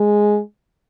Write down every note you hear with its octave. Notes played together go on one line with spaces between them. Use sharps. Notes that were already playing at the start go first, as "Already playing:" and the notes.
Already playing: G#3